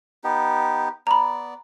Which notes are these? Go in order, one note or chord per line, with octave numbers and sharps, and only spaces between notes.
B3 D#4 G4
B3 D5 A#5 B5